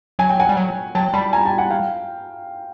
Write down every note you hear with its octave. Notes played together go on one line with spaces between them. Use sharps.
F#3 G#5
G5
F#5 G#5
G3
F#3
F#3 G5 A5
G3 A5 B5
G#5 A#5
G5 A5
F#5 G#5
F5 G5